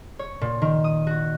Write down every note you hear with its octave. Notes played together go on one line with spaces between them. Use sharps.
C#5
A#2
D#3
D#6
F#4